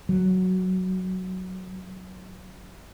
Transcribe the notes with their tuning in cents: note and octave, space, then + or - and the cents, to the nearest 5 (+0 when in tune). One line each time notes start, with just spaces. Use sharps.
F#3 +5